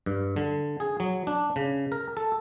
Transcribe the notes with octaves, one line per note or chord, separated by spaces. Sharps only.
G2
D3
G#4
F#3
D4
C#3
A#4
A4